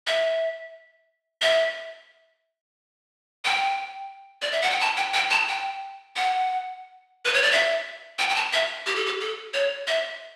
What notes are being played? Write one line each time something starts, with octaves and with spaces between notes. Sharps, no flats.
E5
E5
G5
D5
E5
F#5
G5
A5
G5
G5
A5
G5
F#5
B4
C#5
D5
E5
G5
G5
A5
E5
G4
A4
G4
A4
C#5
E5